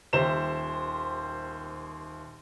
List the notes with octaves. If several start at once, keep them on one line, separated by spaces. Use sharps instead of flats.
D#1 D#2 C5 E5 E7